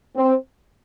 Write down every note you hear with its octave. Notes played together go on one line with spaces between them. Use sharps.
C4